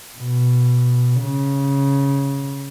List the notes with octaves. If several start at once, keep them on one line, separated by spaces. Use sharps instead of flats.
B2
C#3